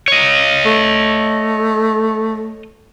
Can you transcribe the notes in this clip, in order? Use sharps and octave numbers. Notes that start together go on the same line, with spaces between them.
C#5 D#5
A3